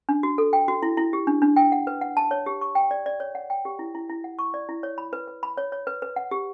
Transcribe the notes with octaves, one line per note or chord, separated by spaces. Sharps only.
D4
F#4
A4
G5
F#4
E4
E4
G4
D4
D4
G5
F#5
B4
F#5
A5
C#5
G4
C#6
G5
D5
D5
C#5
F#5
G5
G4
E4
E4
E4
F#5
C#6
D5
E4
C#5
B5
B4
B4
B5
C#5
C#5
B4
B4
F#5
G4